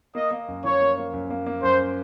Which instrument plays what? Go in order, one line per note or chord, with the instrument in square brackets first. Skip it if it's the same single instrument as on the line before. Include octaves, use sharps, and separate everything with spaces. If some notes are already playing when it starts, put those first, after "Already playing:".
[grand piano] A#3 [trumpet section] D#5
[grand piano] A#3
F#2
[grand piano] F3 [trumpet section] C#5
[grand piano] A#3
A#3
F#2
A#3
A#3
[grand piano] F#2 [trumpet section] C5